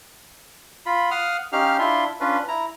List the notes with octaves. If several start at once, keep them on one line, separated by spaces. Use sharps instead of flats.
F4 B5
F5 F#5 D#6 F6
C#4 D#4 G4 F5 F6
D4 E4 F4 E5 C6
C#4 D4 F4 B4
E4 A#5